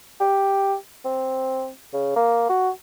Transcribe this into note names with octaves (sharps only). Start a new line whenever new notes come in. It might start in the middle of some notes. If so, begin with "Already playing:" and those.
G4
C4
C#3
A#3
F#4